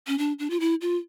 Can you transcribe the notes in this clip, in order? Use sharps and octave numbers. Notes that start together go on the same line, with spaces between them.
C#4
D4
D4
F4
E4
F4